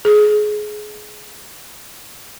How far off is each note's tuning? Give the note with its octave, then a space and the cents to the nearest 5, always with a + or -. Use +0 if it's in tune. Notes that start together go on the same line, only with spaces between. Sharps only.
G#4 +25